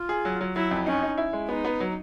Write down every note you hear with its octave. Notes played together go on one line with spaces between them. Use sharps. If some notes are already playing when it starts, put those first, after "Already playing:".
Already playing: F4
G#4
F#3
F#3
F#3 E4
F2
C#4 D#4
D#4
E4
G#3
B3 D#4
B3
F#3